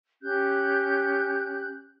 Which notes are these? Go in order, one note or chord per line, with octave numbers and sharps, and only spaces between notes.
C#4 G4 F#6 G6